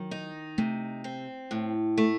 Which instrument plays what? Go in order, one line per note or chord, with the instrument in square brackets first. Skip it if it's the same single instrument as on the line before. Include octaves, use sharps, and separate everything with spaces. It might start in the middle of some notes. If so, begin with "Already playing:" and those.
Already playing: [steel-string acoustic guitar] D#3 [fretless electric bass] F#3
[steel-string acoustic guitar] D#4
[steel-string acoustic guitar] C3 [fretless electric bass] A3
[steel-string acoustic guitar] C4
A2
A3